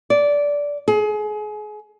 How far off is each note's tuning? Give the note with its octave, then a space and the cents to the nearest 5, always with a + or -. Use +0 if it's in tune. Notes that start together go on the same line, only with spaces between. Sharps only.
D5 -15
G#4 +30